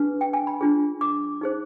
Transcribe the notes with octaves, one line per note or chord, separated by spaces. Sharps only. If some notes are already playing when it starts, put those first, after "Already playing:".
Already playing: D4 G#4 B4
G5
G#5
B5
D4 F4 G#4
D6
D#4 G#4 C5